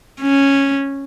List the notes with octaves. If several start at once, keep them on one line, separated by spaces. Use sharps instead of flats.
C#4